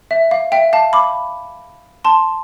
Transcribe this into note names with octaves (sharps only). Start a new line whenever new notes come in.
E5
F5
E5 G5
F5 A5
B5 D6
A5 C6